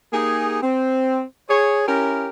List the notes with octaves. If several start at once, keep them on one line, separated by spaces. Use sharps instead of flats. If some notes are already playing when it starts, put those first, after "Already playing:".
A#3 D#4 G4 G#4
C4
G#4 C#5
C#4 E4 G4 A#4